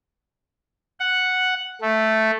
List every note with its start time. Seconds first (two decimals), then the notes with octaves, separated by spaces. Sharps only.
1.00 F#5
1.82 A3